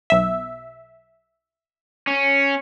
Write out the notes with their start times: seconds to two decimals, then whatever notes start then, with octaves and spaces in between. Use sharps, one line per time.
0.10 B1 E5
2.07 C#4